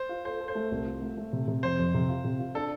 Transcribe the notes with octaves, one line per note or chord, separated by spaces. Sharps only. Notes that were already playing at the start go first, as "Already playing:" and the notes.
Already playing: C5
F4
A4 C5
A4
C5
A3
C2
F4
A3
A3
C3
C3
F2 C5
F2
C3
F4
C3
F4
D4 A4